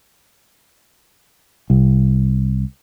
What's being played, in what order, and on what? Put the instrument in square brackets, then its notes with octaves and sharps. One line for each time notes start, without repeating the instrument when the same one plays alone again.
[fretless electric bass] C2